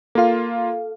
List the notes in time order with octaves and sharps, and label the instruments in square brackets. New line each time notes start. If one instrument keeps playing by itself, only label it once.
[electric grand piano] A#3 F4 [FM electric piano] A4 F5